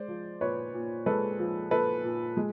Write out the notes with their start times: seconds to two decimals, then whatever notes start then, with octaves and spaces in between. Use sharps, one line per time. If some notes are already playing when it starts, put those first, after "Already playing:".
Already playing: G#3 C5 D5
0.08 F3
0.41 A#2 B4 C#5
0.74 A#2
1.06 G#3 A4 B4
1.39 F3
1.71 A#2 A4 B4
2.04 A#2
2.37 G#3